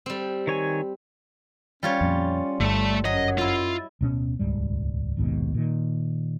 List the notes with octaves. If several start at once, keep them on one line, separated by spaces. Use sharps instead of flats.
G3 C4
D#3 C#5 G#5
G3 C#4 F4 C#5
F2 A#2
G1 G2 G3 A3 A5
F#2 F#3 D#5
E4 F4 D#5
D1 B2 C#4
D#1 C#2 G#2 G3
A#1 D#2 G#2 B2
A#2 D#3